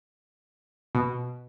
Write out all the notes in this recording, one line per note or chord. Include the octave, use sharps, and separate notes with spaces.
B2